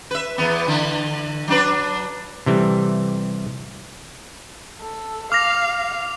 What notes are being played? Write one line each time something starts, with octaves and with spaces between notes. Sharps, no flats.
B4 E5
E2 B3
D3 E3
F#3 D4 B4
C3 E3 G3 A3
A4
F5 D6 F6 A#6 F7